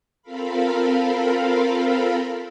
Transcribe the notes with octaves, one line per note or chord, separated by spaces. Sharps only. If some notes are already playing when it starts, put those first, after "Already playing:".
C4 F4 A4 A#4 F5 B5